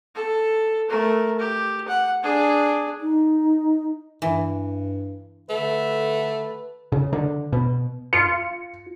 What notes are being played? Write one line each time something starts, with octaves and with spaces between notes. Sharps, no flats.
A4
A3 A#4
G4
F#5
D4 G#4
D#4
G2 E3
D3 A3 B4
C#3
D3
B2
F4 C#7